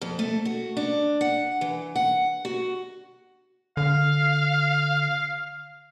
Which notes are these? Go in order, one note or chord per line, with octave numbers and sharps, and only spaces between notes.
F2
A3
F#4
D4
F#5
E3
F#5
F#4
D3 F5